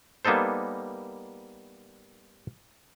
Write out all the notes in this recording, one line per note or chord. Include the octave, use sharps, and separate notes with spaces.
G3 A#3 B3 D#4 A4 C5